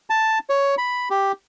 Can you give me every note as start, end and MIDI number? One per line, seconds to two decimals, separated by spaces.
0.10 0.39 81
0.50 0.75 73
0.78 1.09 83
1.10 1.32 67